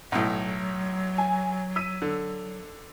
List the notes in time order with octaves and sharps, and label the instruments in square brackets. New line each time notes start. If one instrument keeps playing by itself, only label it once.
[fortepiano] B1 A2 [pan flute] F#3
[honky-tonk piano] G#5
E6 B6 D#7
[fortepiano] D3